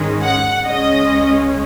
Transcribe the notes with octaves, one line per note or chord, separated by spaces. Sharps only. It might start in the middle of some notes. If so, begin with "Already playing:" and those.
Already playing: G#2 D#3 G#3 C#4
F#5
C#2 C#3 G#3 C#4 D#5